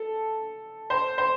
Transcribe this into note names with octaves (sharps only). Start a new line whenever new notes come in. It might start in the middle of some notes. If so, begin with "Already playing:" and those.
Already playing: A4
C5
C5